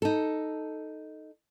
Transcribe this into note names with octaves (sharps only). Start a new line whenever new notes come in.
D#4 A4